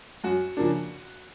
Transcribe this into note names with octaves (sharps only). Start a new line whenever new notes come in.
F#2 F#4
C#3 F3 A#3 D4